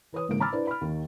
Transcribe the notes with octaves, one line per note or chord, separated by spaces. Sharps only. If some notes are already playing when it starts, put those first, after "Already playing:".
E3 B4 C#5 D#6
G#1 G#2 C#3 E3 A#3 D7
A#5 B5 D6 E6 F6 A6
D4 E4 B4 C5 D5
B5 F6
D#2 D#3